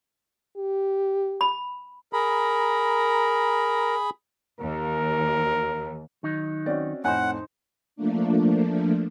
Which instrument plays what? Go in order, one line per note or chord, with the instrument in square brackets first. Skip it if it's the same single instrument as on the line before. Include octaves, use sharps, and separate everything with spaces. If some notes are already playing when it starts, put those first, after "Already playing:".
[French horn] G4
[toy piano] B5
[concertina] G#4 B5 [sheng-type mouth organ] A#4 A#5
[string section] D#2 [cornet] A#4
[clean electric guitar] D#3 F#3 D#4
[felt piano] C4 C#4 F#4 [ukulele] D5 D#5
[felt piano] F2 A2 [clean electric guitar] D#4 C5 [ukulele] C#5 G#5 B5 [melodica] F#5
[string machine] F3 A3 A#3 D4